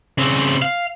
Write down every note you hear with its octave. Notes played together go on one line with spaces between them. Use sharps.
C#3 C4
F5